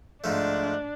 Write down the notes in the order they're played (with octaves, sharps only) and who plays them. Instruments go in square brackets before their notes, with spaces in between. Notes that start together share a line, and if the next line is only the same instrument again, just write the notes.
[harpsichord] G#2 F3 A3 [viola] D4